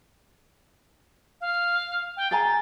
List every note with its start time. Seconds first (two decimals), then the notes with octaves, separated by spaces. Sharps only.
1.41 F5
2.17 G5
2.31 G#4 G#5 A#5 A6